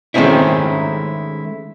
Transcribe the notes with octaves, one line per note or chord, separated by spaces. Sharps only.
D#3 G#3 A3 C4 C#4 E4